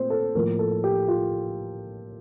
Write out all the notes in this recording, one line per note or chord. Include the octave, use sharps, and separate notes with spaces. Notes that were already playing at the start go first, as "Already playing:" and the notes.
Already playing: A#2 A3 C4 C5
A4
A2 F3 A#3 A#4
A4
G4
F4